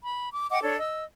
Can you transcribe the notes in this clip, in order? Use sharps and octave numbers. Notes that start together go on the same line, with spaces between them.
B5
D6
D#5 F#5 G5 D6
D4 A4 C#5
D#5 E6